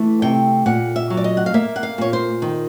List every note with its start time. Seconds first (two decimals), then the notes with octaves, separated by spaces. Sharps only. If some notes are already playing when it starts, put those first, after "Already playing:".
Already playing: E3 A3
0.22 C3 G5
0.66 A#2 F#5
0.96 E5
1.10 F#3
1.17 D5
1.24 D#5
1.37 F#5
1.46 F5
1.54 A#3 E5
1.76 F#5
1.83 F5
1.98 A#2 C#5
2.13 C5
2.42 D#3